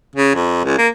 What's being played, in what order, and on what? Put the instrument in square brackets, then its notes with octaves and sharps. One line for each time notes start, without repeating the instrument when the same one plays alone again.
[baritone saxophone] C#3
F2
C#2
A#3